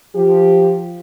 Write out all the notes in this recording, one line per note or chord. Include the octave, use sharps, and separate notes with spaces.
F3 G4